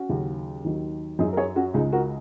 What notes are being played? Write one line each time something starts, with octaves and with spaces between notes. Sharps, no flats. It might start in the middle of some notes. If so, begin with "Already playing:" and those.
Already playing: C#4 F#4
D#2 C#3 F#3
D#2 D#3 F#3
F#2 F#3 D#4 G#4
A#4
G#4 C#5
C#4 F#4
C#2 C#3 G#3 D#4 G#4
F#4 A#4